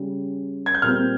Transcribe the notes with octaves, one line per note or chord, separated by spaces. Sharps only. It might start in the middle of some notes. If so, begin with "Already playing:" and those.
Already playing: C#3 G3 C#4
G#6
G6
A#2 G3 C4 F6